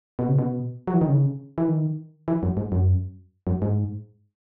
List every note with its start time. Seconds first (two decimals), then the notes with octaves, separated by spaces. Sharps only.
0.19 B2
0.29 C#3
0.39 B2
0.87 F#3
0.94 E3
1.01 D#3
1.08 C#3
1.58 E3
1.68 D#3
2.28 E3
2.43 F#2
2.57 G#2
2.72 F#2
3.47 F#2
3.62 G#2